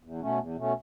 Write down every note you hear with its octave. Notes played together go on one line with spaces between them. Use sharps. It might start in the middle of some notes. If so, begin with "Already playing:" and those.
E2
B2 A3 C#4
E2
B2 A3 C#4